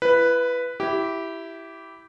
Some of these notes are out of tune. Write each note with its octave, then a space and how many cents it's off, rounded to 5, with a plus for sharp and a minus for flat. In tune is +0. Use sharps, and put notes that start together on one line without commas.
E4 +35 B4 +0
E4 +0 G4 -15